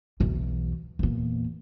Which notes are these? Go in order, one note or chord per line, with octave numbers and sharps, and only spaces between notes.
B1 E2
E2 A#2